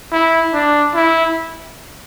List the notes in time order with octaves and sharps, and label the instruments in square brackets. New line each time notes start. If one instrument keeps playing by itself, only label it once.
[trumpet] E4
D4
E4